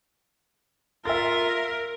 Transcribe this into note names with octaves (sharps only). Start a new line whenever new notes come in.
F4 A#4 E5 A6